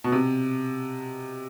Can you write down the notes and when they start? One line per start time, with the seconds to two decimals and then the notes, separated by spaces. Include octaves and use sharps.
0.04 B2
0.12 C3